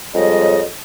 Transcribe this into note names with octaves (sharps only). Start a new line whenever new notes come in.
F2 G3 G#3 C#5 D#5